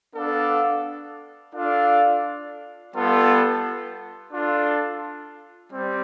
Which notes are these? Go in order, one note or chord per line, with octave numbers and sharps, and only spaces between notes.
B3 D4 A4 D5 F5
D4 F4 A4 D5 F5
G3 B3 F4 A4
D4 F4 A4
G3 C4